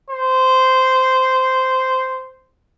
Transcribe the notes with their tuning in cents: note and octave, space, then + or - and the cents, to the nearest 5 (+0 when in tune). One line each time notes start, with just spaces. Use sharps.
C5 -10